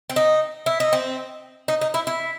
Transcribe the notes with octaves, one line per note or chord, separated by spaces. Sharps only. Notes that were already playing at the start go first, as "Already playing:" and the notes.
C4
D#4
E4
D#4
C4
D#4
D#4
E4
E4